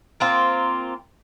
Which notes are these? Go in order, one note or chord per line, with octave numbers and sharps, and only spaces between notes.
A#3 C4 F4